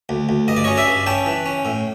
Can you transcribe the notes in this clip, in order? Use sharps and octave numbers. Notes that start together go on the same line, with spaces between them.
D2
D2
G2 D#5
D5
C#4 C#5 D#5
D5 E5
G2
C#4 G5 A5
E3
C#4
A2